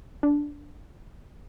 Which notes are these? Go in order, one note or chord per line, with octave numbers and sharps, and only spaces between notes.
D4